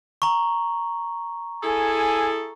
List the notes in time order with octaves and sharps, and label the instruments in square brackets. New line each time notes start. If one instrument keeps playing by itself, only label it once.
[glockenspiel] A#5 C#6
[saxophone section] E4 G#4 A4 [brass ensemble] G#5